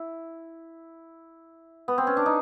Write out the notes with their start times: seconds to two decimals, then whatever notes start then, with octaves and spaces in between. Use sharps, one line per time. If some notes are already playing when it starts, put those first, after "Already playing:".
Already playing: E4
1.88 B3
1.98 C4
2.07 C#4
2.17 D4
2.26 D#4